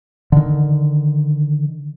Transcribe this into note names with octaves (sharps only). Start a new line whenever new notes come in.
D3 D#3